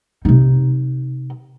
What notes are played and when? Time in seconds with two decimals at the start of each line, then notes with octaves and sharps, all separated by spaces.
0.25 C3 D#4